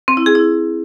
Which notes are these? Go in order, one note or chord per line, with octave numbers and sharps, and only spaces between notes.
C4
E4
G#4
E4